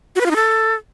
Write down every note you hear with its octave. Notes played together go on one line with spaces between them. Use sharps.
F#4
B4
F4
D#4
A4